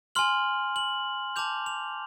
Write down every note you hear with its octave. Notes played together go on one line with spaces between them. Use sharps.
G#5 C6 F6 F#7
F#7
A5 D6 G6 F7
F7